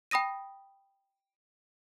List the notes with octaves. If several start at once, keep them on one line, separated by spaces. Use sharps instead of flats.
G5 B5 D#6 A#6 D#7